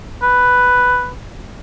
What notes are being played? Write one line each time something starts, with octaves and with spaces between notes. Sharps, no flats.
B4